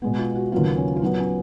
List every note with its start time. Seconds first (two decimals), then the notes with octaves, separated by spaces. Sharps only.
0.02 B2 G#3 B3
0.19 F4
0.35 F#4
0.52 D#2 C#3 F#3 B3 F4
0.77 C#4
0.96 F4
1.02 A#2 F#3 B3 D#4
1.19 C#4